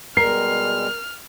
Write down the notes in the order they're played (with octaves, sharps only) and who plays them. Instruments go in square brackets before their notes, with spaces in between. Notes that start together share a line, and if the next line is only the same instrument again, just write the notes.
[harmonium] B2 G3 G#3 [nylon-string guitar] A#4 [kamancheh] F6 [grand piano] C7